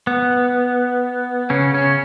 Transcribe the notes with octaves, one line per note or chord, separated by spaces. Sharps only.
B3
C#3 C#4
C#3 C#4